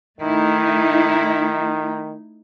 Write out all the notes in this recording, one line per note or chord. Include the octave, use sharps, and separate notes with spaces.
D#3 A3 D#4 E4